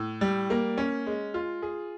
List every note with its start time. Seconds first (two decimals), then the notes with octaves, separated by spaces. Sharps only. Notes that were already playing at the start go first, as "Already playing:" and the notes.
Already playing: A2
0.21 G3
0.50 A#3
0.78 C#4
1.07 G#3
1.34 F4
1.62 G#4